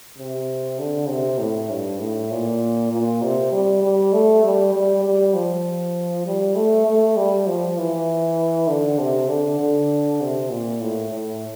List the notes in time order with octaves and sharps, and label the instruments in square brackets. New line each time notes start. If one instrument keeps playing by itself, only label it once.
[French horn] C3
D3
C3
A2
G2
A2
A#2
A#2
C3
G3
G3
A3
G3
G3
G3
F3
G3
A3
A3
G3
F3
E3
D3
C3
D3
D3
C3
A#2
A2
A2